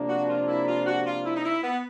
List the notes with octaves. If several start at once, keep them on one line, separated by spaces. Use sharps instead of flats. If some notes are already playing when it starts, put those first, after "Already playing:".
Already playing: C3 F3 A#3 D4
F#4
F4
E4
F4
F#4
F4
E4
D#4
E4
B3